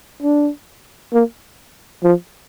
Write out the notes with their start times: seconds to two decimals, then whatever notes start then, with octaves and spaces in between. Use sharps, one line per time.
0.22 D4
1.13 A#3
2.04 F3